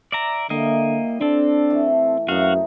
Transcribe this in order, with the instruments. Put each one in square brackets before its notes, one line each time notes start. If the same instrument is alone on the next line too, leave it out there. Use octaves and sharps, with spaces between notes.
[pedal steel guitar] D5 E5 A#5
[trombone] D3 [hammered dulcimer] G3 E4 [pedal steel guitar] A#3 D#5
[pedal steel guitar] C4 A4 [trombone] D4
[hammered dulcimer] E3 A3
[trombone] F#2 [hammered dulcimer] C3 E3 D#4 [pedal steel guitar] F#4 F5